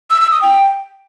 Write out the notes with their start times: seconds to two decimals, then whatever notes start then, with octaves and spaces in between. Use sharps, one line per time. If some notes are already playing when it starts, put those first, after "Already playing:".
0.10 E6
0.21 E6
0.31 D#6
0.42 G5